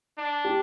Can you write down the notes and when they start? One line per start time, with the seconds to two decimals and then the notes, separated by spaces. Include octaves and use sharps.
0.18 D4
0.45 G4